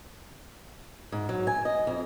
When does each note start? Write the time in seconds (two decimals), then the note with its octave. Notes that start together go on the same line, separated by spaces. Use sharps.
1.12 G#2
1.29 F#3
1.47 G#5
1.65 D#5
1.87 F2